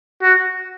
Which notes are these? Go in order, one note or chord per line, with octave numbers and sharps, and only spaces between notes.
F#4